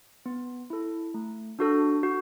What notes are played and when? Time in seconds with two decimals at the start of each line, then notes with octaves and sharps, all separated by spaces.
0.26 B3
0.70 E4 A4
1.14 A3
1.59 D4 F#4 A4
2.03 F#4